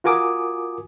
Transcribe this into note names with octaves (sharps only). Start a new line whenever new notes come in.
F4 F#4 A#4 G#5 D6 D#6